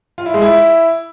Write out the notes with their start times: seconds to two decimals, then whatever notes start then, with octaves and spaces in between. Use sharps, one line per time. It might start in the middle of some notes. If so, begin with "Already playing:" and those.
0.18 F4
0.26 E4
0.34 G#3
0.42 E4